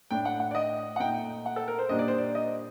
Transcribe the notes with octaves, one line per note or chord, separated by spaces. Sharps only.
A2 A3 D4 G5
F#5
F#5
D5
D#5
F#5
A#2 A3 D#4 G5
F#5
A4
A#4
C5
A#2 G3 A#3 D4 D#5
D5
C5
D5
D#5